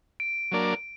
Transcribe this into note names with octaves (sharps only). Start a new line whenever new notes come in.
D7
F#3 A#3 D4 A#4 D5